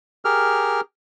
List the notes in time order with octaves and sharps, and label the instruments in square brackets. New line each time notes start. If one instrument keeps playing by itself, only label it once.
[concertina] G4 G#4 A#4 F6